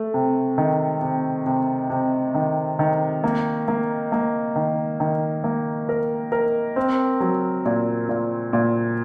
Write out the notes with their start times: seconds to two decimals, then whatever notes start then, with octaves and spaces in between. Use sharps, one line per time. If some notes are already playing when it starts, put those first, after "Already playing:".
Already playing: A3
0.14 C3
0.58 D#3
1.02 C3
1.46 C3
1.90 C3
2.34 D#3
2.79 D#3
3.24 A#3
3.68 A#3
4.12 A#3
4.56 D#3
5.00 D#3
5.44 A#3
5.89 A#4
6.32 A#4
6.76 C4
7.20 F#3
7.65 A#2
8.09 A#2
8.53 A#2